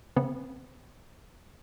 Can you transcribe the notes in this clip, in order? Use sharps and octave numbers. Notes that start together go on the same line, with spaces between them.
C#3 B3 C4